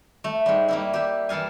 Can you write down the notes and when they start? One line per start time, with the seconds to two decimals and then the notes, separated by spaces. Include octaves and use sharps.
0.24 A3
0.46 G#2 G3
0.68 G3 A#3 E4
0.93 G4 E5
1.29 E3 G3 A4 F5 G#5